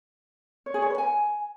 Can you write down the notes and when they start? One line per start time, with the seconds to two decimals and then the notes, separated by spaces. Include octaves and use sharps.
0.66 C#5
0.74 G#4
0.82 C#5
0.90 B4
0.98 G#5